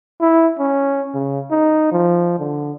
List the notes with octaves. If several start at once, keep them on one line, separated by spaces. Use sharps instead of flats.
E4
C#4
C#3
D#4
F3
D3